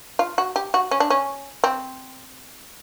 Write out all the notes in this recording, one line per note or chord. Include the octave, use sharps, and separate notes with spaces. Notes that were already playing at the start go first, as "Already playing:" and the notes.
F4
F#4
G4
F#4
C#4
D4
C#4
C4